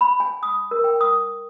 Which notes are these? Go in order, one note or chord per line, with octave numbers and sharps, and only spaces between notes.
B5
G#5
D#6
A#4
G5
D#6